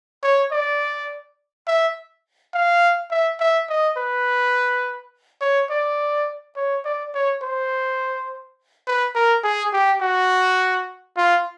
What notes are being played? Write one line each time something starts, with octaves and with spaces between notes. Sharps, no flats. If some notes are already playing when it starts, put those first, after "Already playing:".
C#5
D5
E5
F5
E5
E5
D#5
B4
C#5
D5
C#5
D5
C#5
C5
B4
A#4
G#4
G4
F#4
F4